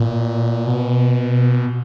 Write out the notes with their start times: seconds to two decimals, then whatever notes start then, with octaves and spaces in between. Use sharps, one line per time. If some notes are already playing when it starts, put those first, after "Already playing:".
Already playing: A#2
0.67 B2